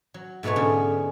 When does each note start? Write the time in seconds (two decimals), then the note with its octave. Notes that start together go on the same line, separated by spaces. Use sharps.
0.14 F#3
0.43 G#2 B2 A3 B3 C#5
0.56 G#2 D3 C#4